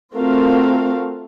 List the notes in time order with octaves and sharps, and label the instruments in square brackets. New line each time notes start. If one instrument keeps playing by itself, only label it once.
[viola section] A3 C4 F4 F#4 A#4 F5